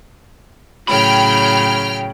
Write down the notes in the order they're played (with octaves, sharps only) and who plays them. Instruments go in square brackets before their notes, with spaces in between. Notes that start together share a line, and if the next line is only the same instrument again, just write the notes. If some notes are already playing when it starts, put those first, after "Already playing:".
[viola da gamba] A2 C#3 F#3 [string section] G5 F6 [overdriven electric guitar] B5